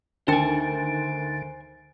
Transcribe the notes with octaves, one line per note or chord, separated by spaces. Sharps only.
D2 D3 D#3 D#4 C5 G5 G#5 A6